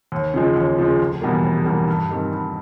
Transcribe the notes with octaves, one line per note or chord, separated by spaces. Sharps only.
D#2
C#3 F3 G#3
D#2
C#3 F3 G#3
F1
E2 B2 G3 A#3
F1
E2 B2 G3 A#3
G2
D#3 G3 C4
G2